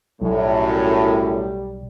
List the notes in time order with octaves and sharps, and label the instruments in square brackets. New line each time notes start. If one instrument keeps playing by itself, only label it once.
[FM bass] B1 [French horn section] F#2 A2 [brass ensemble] G3